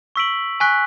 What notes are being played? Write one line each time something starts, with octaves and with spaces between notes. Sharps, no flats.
C#6 E6 B6 D7 F#7
G#5 C#6 F#6 B6 D7